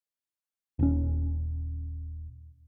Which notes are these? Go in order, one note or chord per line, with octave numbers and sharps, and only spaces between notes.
D#1 C#4